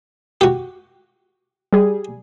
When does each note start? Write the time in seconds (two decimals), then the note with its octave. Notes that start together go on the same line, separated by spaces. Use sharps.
0.41 F#4 G4
1.73 G3 G#4